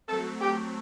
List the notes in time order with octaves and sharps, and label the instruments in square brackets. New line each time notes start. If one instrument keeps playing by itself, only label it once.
[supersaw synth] F#3 A3 C4 [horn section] A4
[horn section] G4